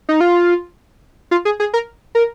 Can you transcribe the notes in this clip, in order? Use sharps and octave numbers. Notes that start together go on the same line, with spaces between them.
D#4
F4
F4
G#4
G#4
A#4
A#4